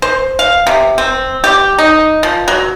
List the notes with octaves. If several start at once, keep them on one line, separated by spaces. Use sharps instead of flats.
C5
F5
C3
C4
G4
D#4
F3
F#3